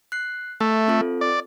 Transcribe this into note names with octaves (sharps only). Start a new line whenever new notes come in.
F#6 C7
A3 E5
C4 F4 A4
D5